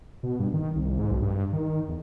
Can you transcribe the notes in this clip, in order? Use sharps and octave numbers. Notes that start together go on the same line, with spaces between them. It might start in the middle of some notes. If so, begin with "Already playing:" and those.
B2
G2
D#3
C2
G#2
B1
G2
D#3
E2